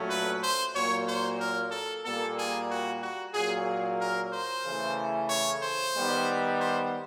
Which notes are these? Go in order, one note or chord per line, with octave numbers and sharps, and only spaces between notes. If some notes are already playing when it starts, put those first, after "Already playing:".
Already playing: A#2 F#3 A3 C#4
B4
C5
A#2 F#3 A#3 C#5
C5
A#4
A4
A#2 G3 A#3 A4
G#4
F#4
F#4
A#2 F#3 A#3 G#4
A#4
C5
C#3 E3 A3
C#5
C5
D#3 G3 B3
C5